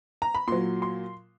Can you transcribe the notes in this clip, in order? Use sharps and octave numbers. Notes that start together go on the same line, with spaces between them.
A#5
B5
A#2 F#3 C6
C6